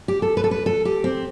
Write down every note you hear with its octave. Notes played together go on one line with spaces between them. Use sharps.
G4
A4
B4
A4
B4
A4
G4
C4